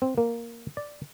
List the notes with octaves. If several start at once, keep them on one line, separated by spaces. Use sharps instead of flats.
C4
A#3
D5